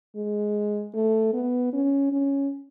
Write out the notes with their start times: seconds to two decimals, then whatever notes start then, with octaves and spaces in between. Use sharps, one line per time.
0.16 G#3
0.95 A3
1.34 B3
1.73 C#4
2.12 C#4